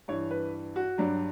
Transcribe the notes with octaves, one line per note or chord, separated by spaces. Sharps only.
G2 E3 C#5
B4
F#4
G2 F#3 D4